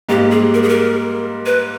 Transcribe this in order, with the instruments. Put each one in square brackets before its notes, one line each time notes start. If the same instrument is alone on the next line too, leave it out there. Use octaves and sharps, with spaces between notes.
[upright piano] G#2 G3 A#3 [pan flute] G4
[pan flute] G#4
A#4
G#4
A#4
B4